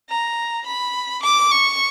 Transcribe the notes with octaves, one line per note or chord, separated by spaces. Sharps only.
A#5
B5
D6
C#6